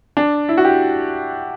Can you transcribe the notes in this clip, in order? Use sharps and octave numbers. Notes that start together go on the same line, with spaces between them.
D4
E4
F#4
G4